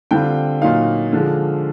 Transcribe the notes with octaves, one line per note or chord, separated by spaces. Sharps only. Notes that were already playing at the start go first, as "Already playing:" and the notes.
D3 G3 C4 F4 G5
A#2 F#3 A#3 D#4 F5
D3 F3 G#3